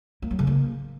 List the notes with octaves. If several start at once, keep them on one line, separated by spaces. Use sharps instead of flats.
A#3
F#3
C#3
A#3